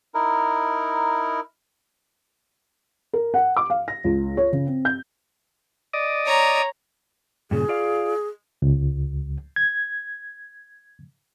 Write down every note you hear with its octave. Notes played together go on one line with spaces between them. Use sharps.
D#4 E4 A#4
A#4
F#5
D6
F5
A#6
C#2
C#5
C#3
C4
G6
D5 D#5
C#5 A#5
G2 A#2 C#3 G#4
F4 D5 F5
C#2
G#6